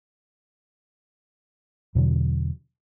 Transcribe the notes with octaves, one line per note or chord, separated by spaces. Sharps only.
E2 B2 D3 F#3